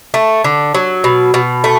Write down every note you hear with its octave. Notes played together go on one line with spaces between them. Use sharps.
A3
D3
F#3
B2
B2
A3